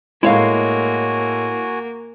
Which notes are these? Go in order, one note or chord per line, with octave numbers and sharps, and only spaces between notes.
A2 G#3 A#3 E4 F#4 C#5 F5 G#5